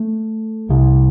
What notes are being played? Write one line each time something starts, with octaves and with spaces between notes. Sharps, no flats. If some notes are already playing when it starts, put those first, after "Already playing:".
Already playing: A3
C2 C3